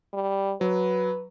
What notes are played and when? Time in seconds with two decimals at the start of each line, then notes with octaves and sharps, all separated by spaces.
0.13 G3
0.61 F#3 B4